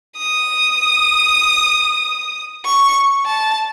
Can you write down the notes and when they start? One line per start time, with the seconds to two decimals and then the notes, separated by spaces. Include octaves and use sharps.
0.18 D#6
2.65 C#6
3.26 A5